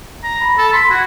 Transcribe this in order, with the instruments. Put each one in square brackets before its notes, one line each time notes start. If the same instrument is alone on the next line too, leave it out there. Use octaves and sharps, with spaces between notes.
[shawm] A#5
[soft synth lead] B5
[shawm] A4
[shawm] B5 [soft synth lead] C6
[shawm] F#4 [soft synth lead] G#6